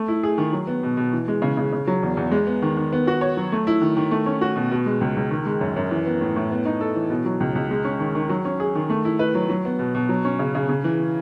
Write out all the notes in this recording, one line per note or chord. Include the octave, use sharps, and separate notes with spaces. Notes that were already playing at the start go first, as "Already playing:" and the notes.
Already playing: A3
E4
G#4
D#3
F#3
B3
B2
B2
E3
G#3
C#3
C#3
C#3
F#3
E2
E2
G#3
B3
D#3
D#3
B3
F#4
C#5
F#3
A3
E4
D#3
D#3
A3
C#4
F#4
B2
B2
G#3
C#2
C#2
D#3
G#3
F#2
F#2
E3
B3
A2
A2
B3
D#4
A4
E3
B2
F#3
C#2
C#2
G#3
C#4
D#3
D#3
F#3
C#4
G#4
D#3
A3
E4
B4
F#3
F#3
B3
B2
B2
F#3
C#4
C#3
C#3
C#3
E3